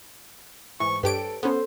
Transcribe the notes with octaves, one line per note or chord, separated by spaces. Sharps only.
G#2 E3 C#6
G2 G4 A4 B4 C#5 D7
B3 C#4 A4 C5